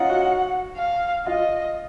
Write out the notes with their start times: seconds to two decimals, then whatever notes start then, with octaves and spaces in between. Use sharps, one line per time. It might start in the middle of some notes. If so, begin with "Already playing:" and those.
Already playing: C#4 D#4 F4 F#5
0.10 F#4
0.77 F5
1.27 F4 D#5